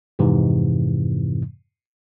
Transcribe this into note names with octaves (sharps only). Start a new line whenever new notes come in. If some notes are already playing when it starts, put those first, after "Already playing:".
F2 G#2 C3 E3